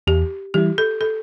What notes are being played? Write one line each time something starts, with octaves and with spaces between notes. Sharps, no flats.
E2 G4
E3 G3 E4 G4
A4
A4